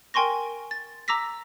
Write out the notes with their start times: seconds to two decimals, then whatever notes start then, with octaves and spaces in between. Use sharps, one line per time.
0.14 A#4 G5 G#5 C6 C#6 A#6
0.71 A6
1.08 A#5 D6 E6 A#6 B6